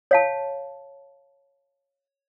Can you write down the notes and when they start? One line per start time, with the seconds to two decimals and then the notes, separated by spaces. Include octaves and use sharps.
0.11 C#5 F5 A5